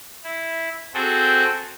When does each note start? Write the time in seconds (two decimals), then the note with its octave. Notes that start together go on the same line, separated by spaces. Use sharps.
0.24 E4
0.94 C4 F#4 G#4 A4 C5 G5